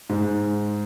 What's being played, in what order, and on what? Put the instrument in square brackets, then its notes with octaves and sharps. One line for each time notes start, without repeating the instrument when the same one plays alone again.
[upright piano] G#2